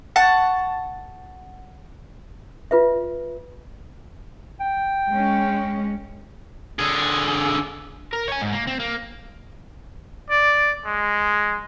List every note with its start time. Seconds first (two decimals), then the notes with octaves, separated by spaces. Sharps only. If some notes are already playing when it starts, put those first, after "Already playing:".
0.16 F#5 A5 C#6
2.71 F4 B4 E5
4.60 G5
5.10 G#3 C#4
6.79 D3 G#4
8.13 A#4
8.28 C#5 G#5
8.41 G#2
8.53 A#3
8.67 C4
8.80 A#3
10.30 D5
10.85 G#3